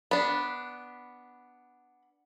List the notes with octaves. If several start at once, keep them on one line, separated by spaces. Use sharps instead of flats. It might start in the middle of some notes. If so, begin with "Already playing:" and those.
B3 D4 B5